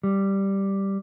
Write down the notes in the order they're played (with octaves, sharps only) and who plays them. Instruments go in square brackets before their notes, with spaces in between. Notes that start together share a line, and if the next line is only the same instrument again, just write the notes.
[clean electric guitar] G3